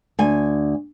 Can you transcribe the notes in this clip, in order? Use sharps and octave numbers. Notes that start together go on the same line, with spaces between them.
D2 G#5